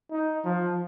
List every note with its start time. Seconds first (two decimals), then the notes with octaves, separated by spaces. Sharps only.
0.11 D#4
0.45 F3